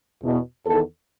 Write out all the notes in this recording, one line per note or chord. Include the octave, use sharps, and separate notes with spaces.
E2 B2
E2 D#3 A4